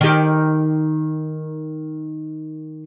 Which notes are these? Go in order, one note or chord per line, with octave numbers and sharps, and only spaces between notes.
D#3 G4